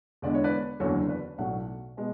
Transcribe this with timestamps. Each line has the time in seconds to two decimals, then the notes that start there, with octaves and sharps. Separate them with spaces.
0.22 E2 D3 G#3 B3 D5
0.34 C#5
0.44 B4 D5
0.80 F#1 E2 D3 F#3 A4 C#5
1.09 B4 D5
1.38 B1 A2 F#3 A3 D5 F#5
1.97 B2 G#3 B3